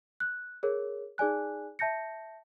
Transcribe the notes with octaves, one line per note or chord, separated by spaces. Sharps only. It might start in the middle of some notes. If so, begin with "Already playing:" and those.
F#6
G#4 A#4 C#5
D#4 G#4 D5 G#5 F#6
E5 A5 G6 A#6 C#7